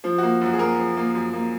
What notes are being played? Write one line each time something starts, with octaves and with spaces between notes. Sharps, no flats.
F3
F#4
A#3
F#2 F#4
G#4
A#3 A#4
F3
A#3
F#2
A#3